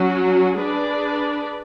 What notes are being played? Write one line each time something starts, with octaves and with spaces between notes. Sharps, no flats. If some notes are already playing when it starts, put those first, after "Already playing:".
Already playing: F#3 C#4 F#4
D4 G#4 B4 D5